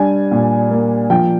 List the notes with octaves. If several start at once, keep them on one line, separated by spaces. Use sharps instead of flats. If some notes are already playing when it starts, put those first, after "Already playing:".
Already playing: G3 D4 G#5
A#2
A#3
F3 G5